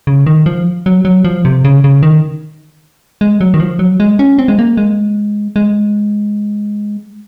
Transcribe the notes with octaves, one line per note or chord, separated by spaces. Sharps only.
C#3
D#3
F3
F#3
F#3
F3
C3
C#3
C#3
D#3
G#3
F#3
D#3
F3
F#3
G#3
C#4
C4
G#3
A#3
G#3
G#3